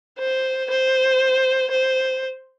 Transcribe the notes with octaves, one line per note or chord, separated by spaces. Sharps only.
C5
C5
C5